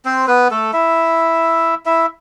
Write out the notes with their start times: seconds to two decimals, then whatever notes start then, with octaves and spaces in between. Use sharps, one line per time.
0.05 C4 C5
0.27 B3 B4
0.51 A3 A4
0.73 E4 E5
1.86 E4 E5